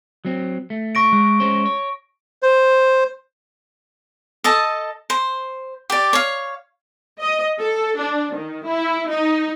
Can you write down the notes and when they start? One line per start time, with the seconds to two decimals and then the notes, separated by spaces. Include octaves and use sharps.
0.25 F#3 C4
0.70 A3
0.95 C#6 A#6 D7
1.13 G#3
1.40 G#3 C#4 C5
1.66 C#5
2.43 C5
4.44 A4 D#5 A5
5.10 C5
5.90 G4 D5
6.13 C#5 F5
7.20 D#5
7.59 A4
7.98 D4
8.35 D#3
8.65 E4
9.11 D#4